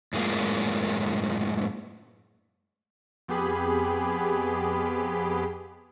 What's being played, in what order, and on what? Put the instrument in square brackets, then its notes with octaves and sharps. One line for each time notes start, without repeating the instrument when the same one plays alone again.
[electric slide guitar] F#2 A2 G#3 A#3 F4
[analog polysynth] F2 B3 G4 G#4 B5